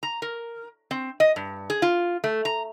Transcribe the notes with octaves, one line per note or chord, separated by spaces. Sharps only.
A#5
A#4
C4
D#5
G2
G#4
F4
A3
A#5